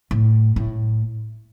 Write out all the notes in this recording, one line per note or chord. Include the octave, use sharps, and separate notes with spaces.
A2
A2